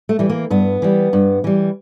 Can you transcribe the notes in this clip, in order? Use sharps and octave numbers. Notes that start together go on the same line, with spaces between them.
A3
E3 G3
A#3
G2 B3
E3 G3
G2
E3 G3